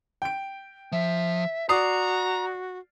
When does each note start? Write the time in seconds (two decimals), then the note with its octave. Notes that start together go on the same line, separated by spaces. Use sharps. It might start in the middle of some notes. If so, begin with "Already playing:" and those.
0.22 G5 D7
0.92 F3 E5
1.69 F#4 D5 A#5 D#6 C7